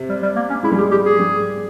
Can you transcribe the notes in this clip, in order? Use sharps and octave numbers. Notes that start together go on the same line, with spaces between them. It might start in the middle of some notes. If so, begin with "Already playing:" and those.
Already playing: C3
G3
G3
A#3
C#4
G#3 E4
G3
G#3 G4
G4
G#4
G3